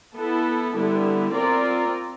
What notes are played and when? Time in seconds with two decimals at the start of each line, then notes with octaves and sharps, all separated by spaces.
0.15 B3 E4 A4
0.74 D3 G3 B3 E4
1.32 C4 F4 A#4 D5